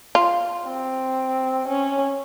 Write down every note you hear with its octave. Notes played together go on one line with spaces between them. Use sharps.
F4
C4
C#4